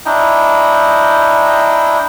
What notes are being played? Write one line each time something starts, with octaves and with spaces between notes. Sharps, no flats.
D4 E4 D#5 G5 A#5